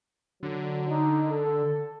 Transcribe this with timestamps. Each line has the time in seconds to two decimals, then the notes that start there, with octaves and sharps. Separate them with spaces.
0.43 D3 F#3
0.88 D#4
1.30 A4